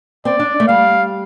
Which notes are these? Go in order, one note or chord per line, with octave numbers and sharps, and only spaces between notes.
C4 D5
D4
A3
G3 F5